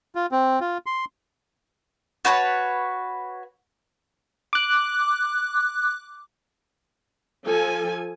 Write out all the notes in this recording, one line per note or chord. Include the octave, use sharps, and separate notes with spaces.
F4
C4
F4
C6
F#4 B4 C#5 A5
D6 F#6
F3 A4 G#5